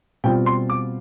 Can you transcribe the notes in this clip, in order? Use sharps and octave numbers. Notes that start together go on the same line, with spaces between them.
B2 G3 C4 F4 G5
C6
D6